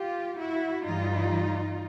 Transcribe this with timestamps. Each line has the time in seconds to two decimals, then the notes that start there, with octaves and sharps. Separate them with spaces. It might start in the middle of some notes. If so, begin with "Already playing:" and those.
Already playing: F4 G4
0.38 E4 F#4
0.84 G2 E3 G3 D#4 F4